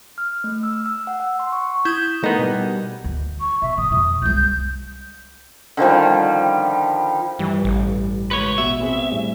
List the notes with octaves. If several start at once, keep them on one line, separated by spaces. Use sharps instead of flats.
F6
A3
E6
E6
F#5
F#5
C6
C#6
E4 D#6 G6 G#6 E7
A3 B3 D#4 A#4
B2 G3
D2
C#6
B2 E5
A2 D#6
F2 B2
C2 G#3 G6
D3 D#3 F3 G3
G2 E3
A1
C#2 B4 C#5 C#7
B2 E5
B3 C4 G#4
A2 G3